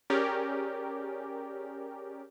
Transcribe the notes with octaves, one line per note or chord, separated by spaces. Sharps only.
C#4 G4 G#4 A#4 D5